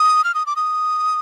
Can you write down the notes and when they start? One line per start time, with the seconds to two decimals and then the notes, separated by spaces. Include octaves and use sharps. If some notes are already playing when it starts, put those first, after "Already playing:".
Already playing: D#6
0.24 F6
0.35 D#6
0.46 D6
0.56 D#6